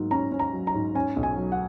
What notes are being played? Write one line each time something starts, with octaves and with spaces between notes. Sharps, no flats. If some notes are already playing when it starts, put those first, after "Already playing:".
Already playing: G#2 F#3 A#3
C#4 A#5
C#4
A#5
F#3
A#5
G#2
C#4 G#5
B1
G#5
F#3
F#5